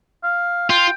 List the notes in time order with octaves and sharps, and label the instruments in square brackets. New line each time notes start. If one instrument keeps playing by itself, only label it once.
[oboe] F5
[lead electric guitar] F4 [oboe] G5